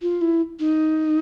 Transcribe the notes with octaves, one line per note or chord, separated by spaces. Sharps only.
F4
E4
D#4